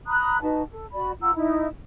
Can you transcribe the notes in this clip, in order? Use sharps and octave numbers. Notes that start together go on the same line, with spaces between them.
A#5 B5 D#6 F#6
D#4 F#4 B4 A5
A4
F#4 D5 B5
F4 F#5 A#5 E6
D#4 E4